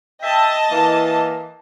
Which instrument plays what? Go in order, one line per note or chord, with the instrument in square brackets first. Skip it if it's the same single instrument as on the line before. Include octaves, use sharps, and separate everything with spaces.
[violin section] D#5 A5 [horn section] E5 G5
[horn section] E3 A#3